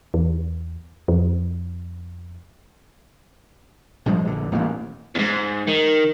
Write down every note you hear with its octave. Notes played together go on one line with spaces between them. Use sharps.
E2
F2
A#1 G2 F3 G#3
A#1 D3
D#1 A1 D#2 A#3
E2 G#2
D#3